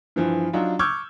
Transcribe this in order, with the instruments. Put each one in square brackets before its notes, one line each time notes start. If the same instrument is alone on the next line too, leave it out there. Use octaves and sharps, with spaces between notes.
[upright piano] G2 E3 F3
F#3 D4 D#4 F4
C#6 D6 E6 F6 G6 G#6